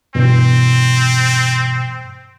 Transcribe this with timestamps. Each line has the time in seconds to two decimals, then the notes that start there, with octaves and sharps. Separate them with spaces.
0.15 G2 B2 E3 C4